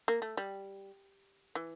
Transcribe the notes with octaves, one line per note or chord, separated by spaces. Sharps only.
A#3
A3
G3
E3